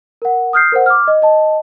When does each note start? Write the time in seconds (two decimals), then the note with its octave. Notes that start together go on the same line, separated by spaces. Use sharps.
0.22 A#4 F#5
0.53 D#6 F6 G6 C7
0.72 A#4 C5 F#5
0.86 D6 F6
1.08 D#5
1.22 D#5 A5